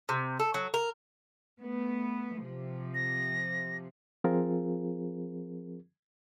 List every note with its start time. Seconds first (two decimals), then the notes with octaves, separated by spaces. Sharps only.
0.09 C3
0.39 A4
0.54 F#3
0.74 A#4
1.61 A3 B3
2.43 C3 F3
2.95 A#6
4.24 F3 C4 F4 G#4 A#4